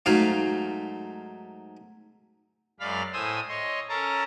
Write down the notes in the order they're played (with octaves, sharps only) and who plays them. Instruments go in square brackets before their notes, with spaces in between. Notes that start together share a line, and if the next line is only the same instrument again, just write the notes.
[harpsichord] G#2 F#3 A3 F5
[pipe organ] F#2 G#3 D5 F5 B5 F6
A2 C5 G#5 C6 D#6 E6
C#5 D#5 C6
C#4 A4 A#4 A5 A#5